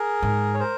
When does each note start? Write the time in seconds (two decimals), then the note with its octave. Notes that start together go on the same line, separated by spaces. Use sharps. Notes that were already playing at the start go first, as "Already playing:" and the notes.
Already playing: G#4 A#4
0.22 G#2
0.54 C#5
0.60 A#4 C5